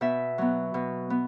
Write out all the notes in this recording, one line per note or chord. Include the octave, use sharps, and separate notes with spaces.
B2 E5
F#3 B3
B2
B3